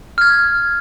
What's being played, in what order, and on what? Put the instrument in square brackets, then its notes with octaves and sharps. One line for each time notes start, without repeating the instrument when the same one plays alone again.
[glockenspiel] F6 G#6